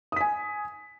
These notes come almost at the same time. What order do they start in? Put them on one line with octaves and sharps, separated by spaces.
D#6 B6 G#5